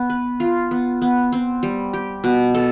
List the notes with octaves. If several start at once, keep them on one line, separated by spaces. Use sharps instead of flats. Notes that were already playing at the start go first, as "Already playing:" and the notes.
Already playing: B3
B4
F4
B3
B3
C4
G3
G4
B2
A4